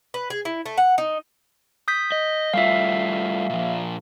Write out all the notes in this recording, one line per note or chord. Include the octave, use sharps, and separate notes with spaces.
B4
G#4
E4
A3
F#5
D#4
D#6 G6 B6
D#5
G3 A3 F4 E5 F5
A#2 F3